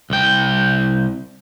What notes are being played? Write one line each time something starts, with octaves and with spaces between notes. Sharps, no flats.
C2 G5